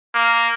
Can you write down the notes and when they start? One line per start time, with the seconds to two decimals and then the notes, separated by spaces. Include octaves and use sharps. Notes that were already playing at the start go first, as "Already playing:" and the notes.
0.15 A#3